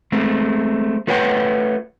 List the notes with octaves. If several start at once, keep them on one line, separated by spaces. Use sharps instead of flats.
G#3 A3 C4
A3 F4 B4 C#5 F#5 G5